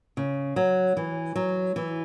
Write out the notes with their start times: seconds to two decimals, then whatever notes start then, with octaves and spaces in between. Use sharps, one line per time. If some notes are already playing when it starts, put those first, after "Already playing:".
0.17 C#3
0.56 F#3
0.97 E3
1.36 F#3
1.76 E3